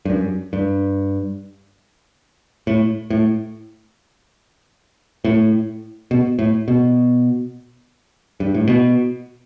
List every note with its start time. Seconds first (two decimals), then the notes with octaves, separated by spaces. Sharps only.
0.05 G2
0.10 F#2
0.53 G2
2.67 A2
3.10 A2
5.25 A2
6.11 B2
6.39 A2
6.68 B2
8.40 G2
8.54 A2
8.68 B2